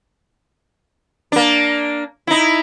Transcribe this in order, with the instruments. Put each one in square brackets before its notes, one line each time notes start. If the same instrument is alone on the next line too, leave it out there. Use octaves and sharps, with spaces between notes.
[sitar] A#3 D4
D#4 E4